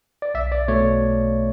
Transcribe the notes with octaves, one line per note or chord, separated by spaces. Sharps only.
D5
B1 E5
D5
B2 A3 C#5